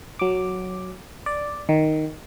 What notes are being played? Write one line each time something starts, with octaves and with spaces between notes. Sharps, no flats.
F#3 D6
D5
D#3